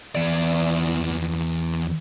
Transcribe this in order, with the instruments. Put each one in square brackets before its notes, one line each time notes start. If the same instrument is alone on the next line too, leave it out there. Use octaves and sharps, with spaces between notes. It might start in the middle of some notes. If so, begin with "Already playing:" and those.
[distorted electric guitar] E2 D5